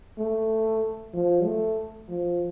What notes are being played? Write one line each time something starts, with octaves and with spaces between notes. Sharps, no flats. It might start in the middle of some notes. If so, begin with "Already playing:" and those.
A3
F3
A3
F3